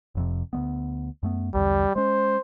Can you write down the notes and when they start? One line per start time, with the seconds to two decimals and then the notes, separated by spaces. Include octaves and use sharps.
0.15 F1 F2 C3
0.53 D2 G#3 B3
1.23 F#2 A3 B3
1.54 B1 E2 D3 G3
1.96 G#3 C#4 C5